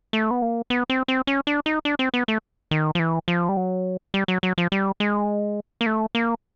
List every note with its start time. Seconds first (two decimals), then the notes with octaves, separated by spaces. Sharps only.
0.13 A3
0.31 B3
0.42 A#3
0.70 B3
0.90 C4
1.08 C4
1.27 C#4
1.47 D4
1.66 D#4
1.85 D4
1.99 C4
2.14 B3
2.28 A3
2.71 D#3
2.95 F3
2.99 E3
3.28 F3
3.49 G3
3.57 F#3
4.14 G3
4.28 F#3
4.43 F#3
4.58 F3
4.72 G3
5.00 G#3
5.81 A#3
5.86 A3
6.15 A#3